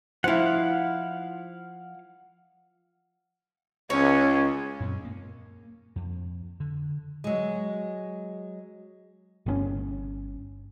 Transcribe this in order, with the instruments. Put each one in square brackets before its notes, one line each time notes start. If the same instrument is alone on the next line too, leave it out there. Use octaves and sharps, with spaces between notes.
[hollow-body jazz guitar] F3 E4 [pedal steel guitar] F5 F#5
[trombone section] C#2 [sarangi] C#4 [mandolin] C#5
[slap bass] F#2 A#2 C4
A#3
F2
D3
[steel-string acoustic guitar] F#3 G#3
[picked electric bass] G1 A#2 C#4